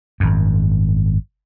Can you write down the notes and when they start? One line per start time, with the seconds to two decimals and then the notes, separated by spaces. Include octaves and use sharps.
0.20 G#1 F#2